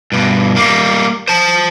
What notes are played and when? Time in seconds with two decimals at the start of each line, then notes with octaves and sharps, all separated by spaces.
0.12 G2 B2
0.56 G3 A#3
1.28 C5 A5